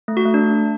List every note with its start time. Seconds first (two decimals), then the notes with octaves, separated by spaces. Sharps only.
0.08 A3
0.17 F#4
0.25 A3
0.34 D4